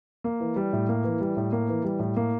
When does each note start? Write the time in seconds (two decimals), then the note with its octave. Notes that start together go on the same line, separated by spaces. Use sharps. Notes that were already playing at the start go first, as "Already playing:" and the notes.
0.24 A#3
0.40 E3
0.56 G3
0.73 A2
0.89 A#3
1.04 E3
1.21 G3
1.37 A2
1.52 A#3
1.69 E3
1.84 G3
1.99 A2
2.17 A#3